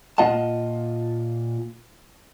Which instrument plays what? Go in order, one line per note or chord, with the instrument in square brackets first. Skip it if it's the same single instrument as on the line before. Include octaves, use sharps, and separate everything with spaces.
[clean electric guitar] A#2 A#3 F4 D#5 F#5 A5